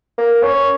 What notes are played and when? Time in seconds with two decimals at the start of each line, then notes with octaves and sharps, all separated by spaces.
0.18 A#3
0.43 C#4